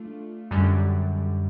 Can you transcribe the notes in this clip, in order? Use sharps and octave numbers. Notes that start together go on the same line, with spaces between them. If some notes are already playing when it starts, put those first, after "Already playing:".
Already playing: A3 D4 F4
F#2 D3 G3